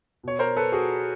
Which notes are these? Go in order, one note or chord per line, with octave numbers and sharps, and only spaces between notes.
B2 C#5
A#4 C5
A4 B4
F#4 G#4